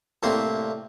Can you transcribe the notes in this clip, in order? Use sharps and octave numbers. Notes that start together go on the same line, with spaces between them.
C2 A2 A#3 C4 C5